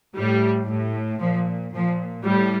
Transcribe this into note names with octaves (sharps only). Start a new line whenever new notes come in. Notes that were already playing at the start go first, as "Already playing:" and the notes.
A2 G3
A2
A#2 F3
A#2 F3
A2 G3